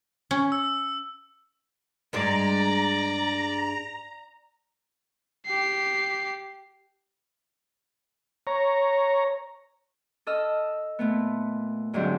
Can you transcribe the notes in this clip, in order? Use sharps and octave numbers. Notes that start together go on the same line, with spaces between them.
C#4
E6
G2 G#3 D4 D5 A#5
G4 C7
C#5 A#5
A4 D#5 E6 F6
A#2 A3 B3
D2 G#2 D3 F#3 C4 G4